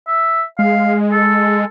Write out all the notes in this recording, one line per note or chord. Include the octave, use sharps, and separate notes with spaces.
E5
G#3 F5
A4